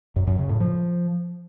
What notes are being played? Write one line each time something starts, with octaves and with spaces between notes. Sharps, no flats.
F#2
F#2
C#3
A2
F3